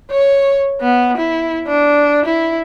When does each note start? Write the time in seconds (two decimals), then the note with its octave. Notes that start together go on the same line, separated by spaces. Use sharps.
0.11 C#5
0.81 B3
1.17 E4
1.67 D4
2.26 E4